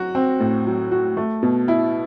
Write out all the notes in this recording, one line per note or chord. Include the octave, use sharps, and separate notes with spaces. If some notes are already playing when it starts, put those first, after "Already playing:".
Already playing: F#3 F#4
C4
A2
F#3
F#4
A3
B2
E4